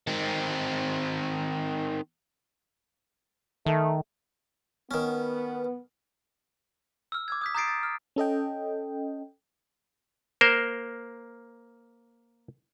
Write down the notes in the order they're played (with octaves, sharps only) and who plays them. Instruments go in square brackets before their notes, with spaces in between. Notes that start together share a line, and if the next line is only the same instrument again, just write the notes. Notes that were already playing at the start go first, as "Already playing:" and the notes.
[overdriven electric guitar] D#3 C4
[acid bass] D#3 [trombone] A3
[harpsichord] D#3 C#4 [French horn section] B3
[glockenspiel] E6 F6
D6 E6 G#6
D#6 G6 B6
A#5 D#6 G6 A6 C7 D7
A6
F6
[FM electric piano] C#4 A4 D#5 G5
[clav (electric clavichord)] A#3 A#4 C5